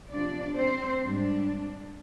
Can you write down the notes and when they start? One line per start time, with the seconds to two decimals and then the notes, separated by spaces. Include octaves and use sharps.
0.10 C3 F3 B3 D4 D5
0.56 C4 C5
1.01 G#2 G3 C4 D4